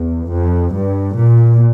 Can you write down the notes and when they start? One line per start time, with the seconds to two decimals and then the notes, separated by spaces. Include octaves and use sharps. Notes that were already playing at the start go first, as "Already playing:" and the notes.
Already playing: E2
0.31 F2
0.75 G2
1.18 A#2